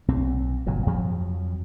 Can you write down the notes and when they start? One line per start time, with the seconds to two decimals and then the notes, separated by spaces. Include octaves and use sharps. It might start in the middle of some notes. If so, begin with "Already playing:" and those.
0.08 B1 C4
0.67 G1 A#2 F#3
0.86 F2 F3 F#3